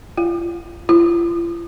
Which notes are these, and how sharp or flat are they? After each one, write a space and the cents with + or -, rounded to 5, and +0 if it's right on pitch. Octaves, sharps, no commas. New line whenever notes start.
F4 -30
F4 -45